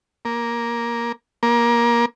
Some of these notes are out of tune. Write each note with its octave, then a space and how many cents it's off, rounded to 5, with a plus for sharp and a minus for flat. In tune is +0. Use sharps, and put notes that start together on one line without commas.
A#3 +10
A#3 +20